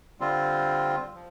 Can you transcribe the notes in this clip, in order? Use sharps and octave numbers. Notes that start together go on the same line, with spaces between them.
D3 G3 C4 F4
F3